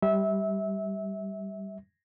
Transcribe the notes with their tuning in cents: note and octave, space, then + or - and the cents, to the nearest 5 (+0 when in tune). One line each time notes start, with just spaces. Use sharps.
G3 +0 E5 -25